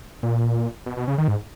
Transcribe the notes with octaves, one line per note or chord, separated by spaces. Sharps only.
A#2
B2
B2
C#3
D#3
G#2